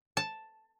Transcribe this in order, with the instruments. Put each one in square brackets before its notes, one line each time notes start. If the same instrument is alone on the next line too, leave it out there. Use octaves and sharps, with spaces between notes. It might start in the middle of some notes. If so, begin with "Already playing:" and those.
[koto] A5